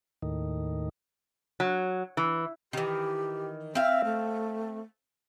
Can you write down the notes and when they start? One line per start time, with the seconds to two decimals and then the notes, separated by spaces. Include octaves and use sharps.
0.22 D#2 A2 D#3
1.60 F#3
2.17 E3
2.73 D#3 E3 G4
3.75 C4 E5 F5
4.05 A3